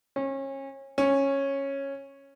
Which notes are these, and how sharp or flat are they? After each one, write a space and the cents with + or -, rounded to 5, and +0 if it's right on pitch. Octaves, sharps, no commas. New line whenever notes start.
C#4 -30
C#4 -10